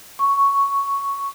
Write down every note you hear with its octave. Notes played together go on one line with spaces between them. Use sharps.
C#6